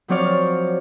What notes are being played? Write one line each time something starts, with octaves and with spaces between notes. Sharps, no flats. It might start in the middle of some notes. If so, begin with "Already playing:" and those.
F3 F#3 C4 C#5 D5 F5